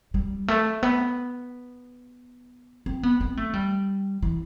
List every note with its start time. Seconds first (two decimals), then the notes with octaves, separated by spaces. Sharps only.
0.14 G3
0.48 A3
0.83 B3
2.86 C4
3.03 B3
3.20 C4
3.37 A3
3.53 G3
4.22 E3